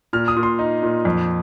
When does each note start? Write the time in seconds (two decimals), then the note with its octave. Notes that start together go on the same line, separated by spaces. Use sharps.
0.13 A#2 F6
0.28 D#6
0.36 A#2
0.43 C6
0.59 D#4
0.83 A#2
1.05 F2